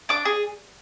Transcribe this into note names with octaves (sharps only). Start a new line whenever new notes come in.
D4 D6
G#4